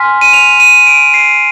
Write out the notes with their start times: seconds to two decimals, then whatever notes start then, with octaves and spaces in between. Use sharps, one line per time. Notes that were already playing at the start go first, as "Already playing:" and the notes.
Already playing: G#5 C6 F6 B6
0.21 D#7
0.33 F7
0.60 D#7
0.87 D7
1.14 C7